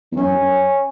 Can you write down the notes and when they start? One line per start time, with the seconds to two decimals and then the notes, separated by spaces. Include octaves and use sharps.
0.12 E2
0.16 F#2 C#4
0.36 F#2